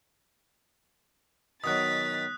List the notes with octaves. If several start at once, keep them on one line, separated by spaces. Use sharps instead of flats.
B2 D#3 F#3 D#6 F#6 A6 B6